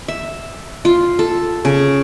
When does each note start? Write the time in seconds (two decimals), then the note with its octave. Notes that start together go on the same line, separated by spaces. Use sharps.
0.08 E5
0.85 F4
1.19 A4
1.65 C#3